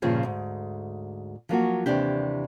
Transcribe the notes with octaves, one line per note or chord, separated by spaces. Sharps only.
G2 A#2 C#3 F3 F4 G#4
D2 G#2
F3 F#3 A#3 F#4
D#2 C3 E3 D4 G4